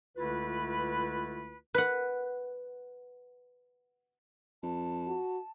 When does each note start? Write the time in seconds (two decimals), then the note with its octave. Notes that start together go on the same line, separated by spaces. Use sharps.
0.17 C#2 D3 A3 E4 F4 B4
1.75 B4 F#5
4.63 F2 A5
5.07 F#4